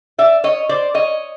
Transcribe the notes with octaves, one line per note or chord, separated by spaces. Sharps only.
D5 E5
C#5 D#5
C5 D5
C#5 D#5